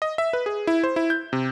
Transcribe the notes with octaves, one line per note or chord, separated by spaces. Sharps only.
D#5
E5
B4
G#4
E4
C5
E4
G6
C3